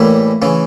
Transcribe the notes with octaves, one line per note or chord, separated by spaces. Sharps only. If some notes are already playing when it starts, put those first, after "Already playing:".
Already playing: A2 E3 G3 A3 A#3 E4
C#3 E3